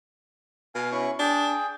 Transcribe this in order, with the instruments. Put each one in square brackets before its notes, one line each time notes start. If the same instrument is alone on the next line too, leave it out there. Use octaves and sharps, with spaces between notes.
[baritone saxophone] B2 [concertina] F5 G#5
[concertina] C#4 E4 C#6
[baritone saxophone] D4 [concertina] G#4 G5